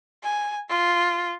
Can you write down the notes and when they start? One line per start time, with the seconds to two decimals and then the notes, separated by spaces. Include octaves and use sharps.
0.23 G#5
0.70 F4